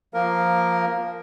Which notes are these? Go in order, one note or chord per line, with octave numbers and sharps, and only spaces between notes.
F3 A#3 A#4 F5